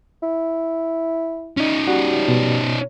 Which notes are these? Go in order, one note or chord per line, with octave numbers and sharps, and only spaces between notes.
E4
C#4 D#4
G3 F#4
B2